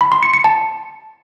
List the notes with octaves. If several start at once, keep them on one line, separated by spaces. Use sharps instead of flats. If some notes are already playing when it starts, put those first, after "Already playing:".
B5
C6
C#7
C#7
A5